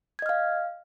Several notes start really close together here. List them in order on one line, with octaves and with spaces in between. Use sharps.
G#6 D#5 F6 F5